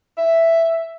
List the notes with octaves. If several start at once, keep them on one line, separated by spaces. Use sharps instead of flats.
E5